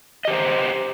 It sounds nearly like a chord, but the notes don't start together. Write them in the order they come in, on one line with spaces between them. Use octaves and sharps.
D#5 G4 C5 A#5